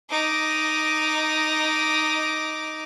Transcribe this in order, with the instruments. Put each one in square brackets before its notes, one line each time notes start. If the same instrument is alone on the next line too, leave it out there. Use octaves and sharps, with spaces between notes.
[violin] D#4 D6